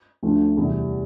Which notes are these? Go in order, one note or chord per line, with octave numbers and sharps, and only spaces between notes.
D2 D3 F3 A3
E2 C3 G3